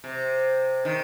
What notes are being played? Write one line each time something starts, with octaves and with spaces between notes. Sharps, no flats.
C3
D#3